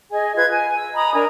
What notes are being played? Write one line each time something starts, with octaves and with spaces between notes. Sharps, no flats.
G#4 D#5 G#5
F4 B4 G#6
G#5
E6
D#5 A#5 B5 D#6
D4 A#4 G#5 A#5